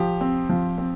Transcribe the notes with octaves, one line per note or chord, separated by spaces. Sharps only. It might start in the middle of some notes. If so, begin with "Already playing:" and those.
Already playing: F3 G4
C4
F3
C4